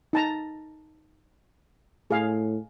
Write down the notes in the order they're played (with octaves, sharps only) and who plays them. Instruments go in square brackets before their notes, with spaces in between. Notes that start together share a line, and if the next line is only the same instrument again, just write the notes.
[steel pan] D#4 A5 A#5
[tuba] A2 [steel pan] G#4 F5